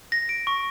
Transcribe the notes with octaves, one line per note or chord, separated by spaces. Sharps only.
A#6
D7
C#6